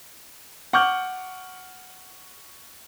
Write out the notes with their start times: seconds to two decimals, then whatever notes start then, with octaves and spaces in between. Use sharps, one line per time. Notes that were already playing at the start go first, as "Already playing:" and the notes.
0.73 F#5 C#6 D6 F6 G6